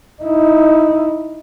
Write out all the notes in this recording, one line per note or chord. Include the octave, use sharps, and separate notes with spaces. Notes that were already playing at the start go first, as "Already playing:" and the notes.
D#4 E4